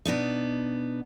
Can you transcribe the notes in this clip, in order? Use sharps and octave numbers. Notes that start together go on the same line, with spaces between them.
B2 B3 D4 D#4